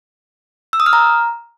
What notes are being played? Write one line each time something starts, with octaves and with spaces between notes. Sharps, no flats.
E6
D#6
F6
A#5